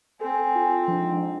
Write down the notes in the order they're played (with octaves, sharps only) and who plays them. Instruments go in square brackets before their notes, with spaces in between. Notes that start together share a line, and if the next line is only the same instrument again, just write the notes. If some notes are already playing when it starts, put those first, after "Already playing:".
[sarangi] C4 [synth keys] A4 [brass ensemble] G#5
[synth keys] F4
[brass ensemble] F2 G#2 [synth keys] F3 D4